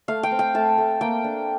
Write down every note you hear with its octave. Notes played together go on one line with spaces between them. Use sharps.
A3 F5
G5
C4
G5
A3 A5
A3
A#3 G5
D4